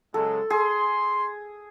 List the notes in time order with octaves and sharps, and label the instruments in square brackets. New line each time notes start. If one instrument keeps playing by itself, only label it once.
[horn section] C#3 F#3 G#3 [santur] A4
[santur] G#4 [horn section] C6